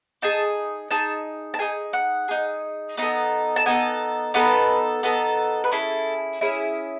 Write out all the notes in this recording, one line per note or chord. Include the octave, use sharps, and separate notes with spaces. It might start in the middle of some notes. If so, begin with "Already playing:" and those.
D#4 G#4 A5
D#4 G#4 A5
A5
D#4 G#4 G#5
F#5
D#4 G#4
B3 D#4 A4
A5
B3 D#4 A4 G#5
B3 D#4 A4 B4
B3 D#4 A4
B4
C#4 E4 G#4 A4
C#4 E4 G#4